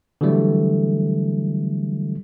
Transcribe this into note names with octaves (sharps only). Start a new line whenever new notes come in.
D3 E3 F#3 G3 A3